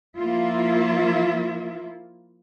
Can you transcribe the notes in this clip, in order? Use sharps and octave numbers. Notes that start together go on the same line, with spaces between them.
F3 A#3 E4 F4 E5